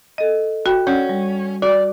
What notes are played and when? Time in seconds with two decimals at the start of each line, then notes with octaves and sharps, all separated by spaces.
0.18 A4 D#5
0.66 F#4 G5 B5
0.87 C#4 D5 F#5 G6
1.09 G3
1.62 F#4 D5